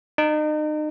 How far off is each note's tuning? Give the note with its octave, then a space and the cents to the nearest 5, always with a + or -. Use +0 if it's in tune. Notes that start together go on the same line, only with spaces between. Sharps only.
D#4 -35